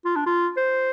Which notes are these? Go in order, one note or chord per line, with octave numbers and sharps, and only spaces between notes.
F4
D4
F4
C5